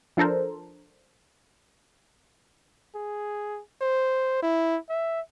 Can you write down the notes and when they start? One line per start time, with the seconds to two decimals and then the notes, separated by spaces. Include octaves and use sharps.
0.17 F3 D4 A4 A#4 C5
2.95 G#4
3.81 C5
4.43 E4
4.90 E5